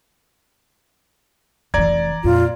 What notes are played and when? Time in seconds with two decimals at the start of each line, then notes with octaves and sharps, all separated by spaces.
1.74 F1 E3 D5 A#5 G#6
2.24 F2 A#2 F4